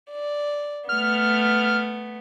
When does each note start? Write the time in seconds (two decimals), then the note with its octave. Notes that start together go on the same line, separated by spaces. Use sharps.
0.10 D5
0.89 A3 B3 F6